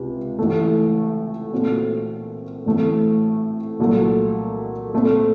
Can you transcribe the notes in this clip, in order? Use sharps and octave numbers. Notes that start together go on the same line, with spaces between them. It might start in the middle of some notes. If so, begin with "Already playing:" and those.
Already playing: C#2 C3
A1 A2 A3
A#2 A3 C4 F#4
A1 A2 A3 C4
C2 A#2 F#3 A3
A#2 A3 C4